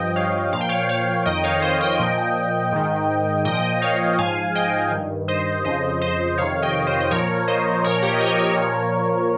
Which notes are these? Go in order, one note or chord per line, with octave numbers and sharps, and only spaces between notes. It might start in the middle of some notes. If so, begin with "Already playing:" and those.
Already playing: G2 F3 D#5 G5
C#5 F5
A#2 F3 F5
G5
C#5 F5
C#5 F5
F2 D#3 D#5 G5
C#5 F5
C5 D#5
D#5 G5
A#2 F3
G#2 D#3
A#2 F3 D#5 G5
C#5 F5
G#2 F3 F5 G#5
D#5 G5
G2 D#3
C5 D#5
F2 C#3 F3 C5 D#5
C5 D#5
F2 C3 D#3 C#5 F5
D#5 G5
C5 D#5
D#5
A#2 F3 A#4 C#5
C5 D#5
A#2 F3 A#4 C#5
G4 A#4
D#5
A#4 C#5
A#4 C#5
A#2 F3